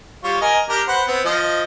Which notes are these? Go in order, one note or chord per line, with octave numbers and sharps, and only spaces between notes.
G3 F4 C#5
A#4 D#5 G#5
D4 G4 A#4
B4 C5 F#5
B3 C4
F3 D#5